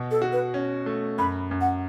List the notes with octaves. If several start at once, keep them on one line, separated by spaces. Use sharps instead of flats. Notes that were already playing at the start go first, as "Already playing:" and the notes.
Already playing: B2
A4
F#4
B4
C#4
A3
F#2 B5
F#2
F#5